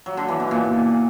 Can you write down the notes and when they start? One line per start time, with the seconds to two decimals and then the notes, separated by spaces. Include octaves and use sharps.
0.06 F#3
0.17 D3
0.29 E3
0.40 B2
0.51 A#2